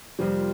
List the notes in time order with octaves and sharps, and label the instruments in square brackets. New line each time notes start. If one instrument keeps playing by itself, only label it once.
[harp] F2 C3 F3 A#3 [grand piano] G3